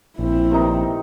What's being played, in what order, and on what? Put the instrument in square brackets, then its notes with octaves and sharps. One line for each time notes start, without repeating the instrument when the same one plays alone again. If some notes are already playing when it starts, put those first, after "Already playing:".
[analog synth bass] A#1 [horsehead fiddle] C4 E4
[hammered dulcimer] C3 D#3 D#4